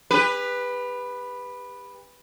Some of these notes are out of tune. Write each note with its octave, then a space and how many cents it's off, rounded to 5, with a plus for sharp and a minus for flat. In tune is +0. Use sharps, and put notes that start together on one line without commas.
G4 +40 B4 +0